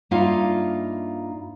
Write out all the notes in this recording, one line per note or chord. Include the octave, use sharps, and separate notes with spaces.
G2 A#3 D#4 F4 E5 F5